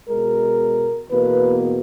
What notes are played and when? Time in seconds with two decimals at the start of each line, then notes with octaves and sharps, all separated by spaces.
0.09 B2 G#3 A#4
1.10 E2 B2 A#3 B4